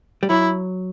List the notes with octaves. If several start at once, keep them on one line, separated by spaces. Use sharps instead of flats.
G3
F#3 E4